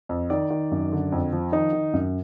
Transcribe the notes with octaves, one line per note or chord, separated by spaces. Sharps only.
F2
D#3 D5
D#3
F#2
D3
F2
F3
D#3 D#4
D#3
F#2